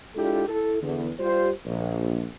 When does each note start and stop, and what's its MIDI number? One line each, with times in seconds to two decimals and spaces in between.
0.15 0.44 56
0.15 0.44 62
0.15 0.44 64
0.15 0.44 65
0.15 0.44 67
0.15 0.44 69
0.48 0.77 64
0.48 0.77 69
0.82 1.09 40
0.82 1.09 50
1.19 1.50 55
1.19 1.50 65
1.19 1.50 67
1.19 1.50 72
1.66 2.25 34